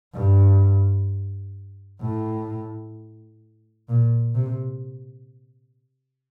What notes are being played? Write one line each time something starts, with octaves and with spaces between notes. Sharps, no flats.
G2
A2
A#2
C3